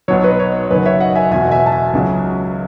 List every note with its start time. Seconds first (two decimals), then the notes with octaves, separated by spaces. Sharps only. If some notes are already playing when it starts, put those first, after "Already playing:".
0.08 B1 B2 F#3 C#5
0.23 B4 D#5
0.39 C#5
0.70 F#1 F#2 D#3 B4
0.86 C#5 E5
1.00 D#5 F#5
1.15 E5 G#5
1.31 E1 E2 B2 E5 G#5
1.51 E5 G#5
1.66 A5
1.72 E5 G#5
1.93 C#2 C#3 F#3